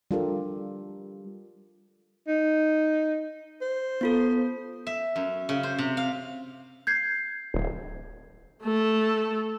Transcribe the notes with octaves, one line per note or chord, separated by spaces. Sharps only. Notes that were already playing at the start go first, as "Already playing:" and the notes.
G3 D4 F4 G4 A4 A#4
D#4
C5
B3 F4 A4
E5
F#2
C#3
C5
C3
F5
G6 G#6 C7
D1
A3 A4